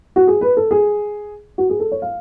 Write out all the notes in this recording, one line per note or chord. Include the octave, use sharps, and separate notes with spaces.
F#4
G#4
B4
A4
G#4
F#4
G#4
A4
C#5
F5